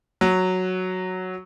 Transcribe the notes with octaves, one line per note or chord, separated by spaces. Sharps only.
F#3